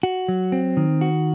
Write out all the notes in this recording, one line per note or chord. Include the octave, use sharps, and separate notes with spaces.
F#4
F#3
C4
D#3
F#4